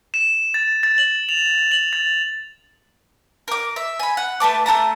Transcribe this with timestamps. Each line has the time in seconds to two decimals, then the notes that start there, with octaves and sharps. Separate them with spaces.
0.14 E7
0.54 A6
0.83 A6
0.98 F#7
1.29 F7
1.71 F#7
1.93 A6
3.48 A#4 D6
3.76 E5
4.00 G#5 B5
4.17 F#5
4.40 A3 B4 A5 D6
4.66 A3 F#4 A5 A#5